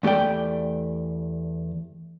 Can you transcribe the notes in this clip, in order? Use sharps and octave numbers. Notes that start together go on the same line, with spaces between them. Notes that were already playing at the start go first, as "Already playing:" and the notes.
E2 A3 G4 D5 G5